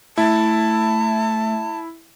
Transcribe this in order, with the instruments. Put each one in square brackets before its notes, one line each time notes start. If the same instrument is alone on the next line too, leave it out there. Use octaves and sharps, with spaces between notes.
[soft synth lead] A3 [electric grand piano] E4 [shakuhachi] A5